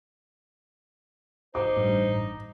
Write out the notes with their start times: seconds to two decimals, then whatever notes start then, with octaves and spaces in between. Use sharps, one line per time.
1.55 D#4 C5 D6
1.76 A1 G2